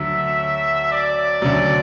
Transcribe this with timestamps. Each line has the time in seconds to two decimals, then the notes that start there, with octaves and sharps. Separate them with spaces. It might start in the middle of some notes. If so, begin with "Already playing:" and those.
Already playing: D2 D3 F#3 E5
0.92 D5
1.42 D2 D3 F#3